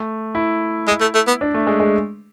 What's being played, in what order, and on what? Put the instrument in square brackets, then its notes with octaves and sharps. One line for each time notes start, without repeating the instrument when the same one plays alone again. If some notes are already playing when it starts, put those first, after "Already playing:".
Already playing: [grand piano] A3
E4
[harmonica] G#3
A3
A3
B3
[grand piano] D4
A3
G#3
G#3